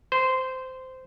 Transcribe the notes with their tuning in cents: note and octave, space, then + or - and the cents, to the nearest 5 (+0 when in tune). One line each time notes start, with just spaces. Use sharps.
C5 -15